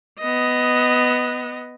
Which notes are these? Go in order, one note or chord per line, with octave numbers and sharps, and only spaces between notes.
B3 D#5